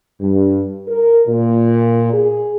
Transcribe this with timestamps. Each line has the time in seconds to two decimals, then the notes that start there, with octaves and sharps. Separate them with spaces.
0.21 G2
0.88 A#4
1.28 A#2
2.13 G#4